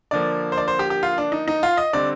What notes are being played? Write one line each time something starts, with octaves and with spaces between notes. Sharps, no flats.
D3 F3 A#3 D5
C5
D5
C5
G4
G4
F4
D4
D#4
D#4
F4
D#5
D3 G3 C4 D5